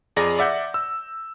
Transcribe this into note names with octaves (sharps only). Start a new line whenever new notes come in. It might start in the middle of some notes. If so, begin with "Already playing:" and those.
F2 G#4 D5 G#5 A#5 A#6
D5 E5 F#5 G6
E6